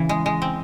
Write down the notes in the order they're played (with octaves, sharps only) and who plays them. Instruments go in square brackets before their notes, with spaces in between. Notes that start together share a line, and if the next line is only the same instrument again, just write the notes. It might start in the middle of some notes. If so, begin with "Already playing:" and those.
Already playing: [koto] C#3 E3
G#3
G#3
C4